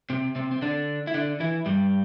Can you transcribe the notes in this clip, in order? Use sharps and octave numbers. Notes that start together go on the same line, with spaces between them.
C3 C4
C3 C4
C4
D3 D4
E4
D3 D4
E3 E4
G2 G3